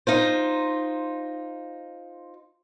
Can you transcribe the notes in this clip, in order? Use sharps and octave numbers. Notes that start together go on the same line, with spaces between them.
D#4 F4 C5